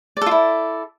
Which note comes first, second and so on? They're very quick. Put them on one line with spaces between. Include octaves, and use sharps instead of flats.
D5 A4 F4 E4